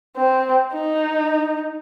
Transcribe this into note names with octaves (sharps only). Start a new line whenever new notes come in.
C4
D#4